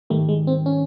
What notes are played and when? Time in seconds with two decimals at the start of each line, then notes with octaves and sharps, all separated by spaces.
0.10 G#2 D#3 G3 A3
0.29 G#3
0.47 C4
0.66 C#4